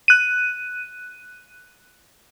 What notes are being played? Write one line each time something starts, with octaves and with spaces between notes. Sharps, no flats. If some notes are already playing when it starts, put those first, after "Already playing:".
F#6 D#7